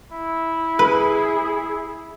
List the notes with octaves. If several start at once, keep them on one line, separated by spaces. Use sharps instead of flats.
E4
G#4 B4